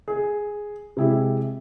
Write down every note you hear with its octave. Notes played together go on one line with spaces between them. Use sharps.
G#4
C3 G#3 E4 G4 G#4